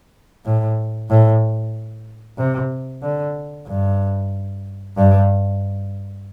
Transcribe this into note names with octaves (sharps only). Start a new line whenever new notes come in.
A2
A2
C3
D3
G2
G2